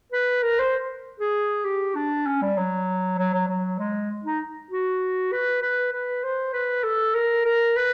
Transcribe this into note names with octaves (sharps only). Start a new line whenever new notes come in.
B4
A#4
C5
G#4
G4
D4
C#4
G3
F#3
F#3
F#3
F#3
G#3
D#4
F#4
B4
B4
B4
C5
B4
A4
A#4
A#4
B4